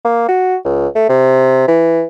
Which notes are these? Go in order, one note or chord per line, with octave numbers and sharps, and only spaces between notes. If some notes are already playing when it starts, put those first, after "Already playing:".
A#3
F#4
C#2
A3
C3
E3